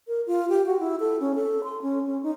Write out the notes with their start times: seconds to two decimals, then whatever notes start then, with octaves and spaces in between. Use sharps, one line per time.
0.08 A#4
0.27 F4
0.49 G4
0.66 F#4
0.80 E4
1.00 A4
1.20 C#4
1.35 A4
1.64 C6
1.82 C#4
2.06 C#4
2.23 D#4